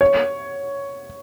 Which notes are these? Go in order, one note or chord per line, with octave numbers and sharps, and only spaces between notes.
C#5